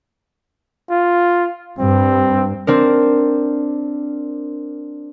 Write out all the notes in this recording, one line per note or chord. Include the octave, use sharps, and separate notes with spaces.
F4
G2 C4
C4 D4 A#4